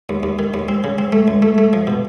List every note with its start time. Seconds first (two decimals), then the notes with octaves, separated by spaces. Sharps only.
0.09 D#2
0.23 D#2
0.39 D#3
0.54 D#2
0.69 C4
0.84 C#3
0.98 C4
1.12 A3
1.28 C#2
1.42 A3
1.58 A3
1.73 F3
1.87 B2